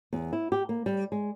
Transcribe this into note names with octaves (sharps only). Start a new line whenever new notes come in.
E2
E4
G4
A#3
G3
G#3